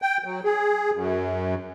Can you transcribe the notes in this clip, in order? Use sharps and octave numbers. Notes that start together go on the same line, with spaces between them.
G5
F#3
G#4
F#2